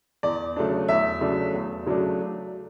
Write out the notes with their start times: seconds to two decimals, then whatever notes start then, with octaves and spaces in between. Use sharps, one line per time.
0.23 E2 D5
0.56 C#3 F#3 A3 D4
0.88 E2 E5
1.21 C#3 F#3 A3 D4
1.54 E2
1.86 C#3 F#3 A3 D4